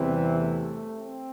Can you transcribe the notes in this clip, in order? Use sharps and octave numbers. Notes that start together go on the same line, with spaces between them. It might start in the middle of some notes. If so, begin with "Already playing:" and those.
Already playing: E2 C3 E3 G3 C4
A3
C4